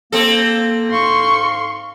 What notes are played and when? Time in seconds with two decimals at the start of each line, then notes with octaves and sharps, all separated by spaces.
0.12 A#3 C4 A4
0.90 G#2 F5 C6 C#6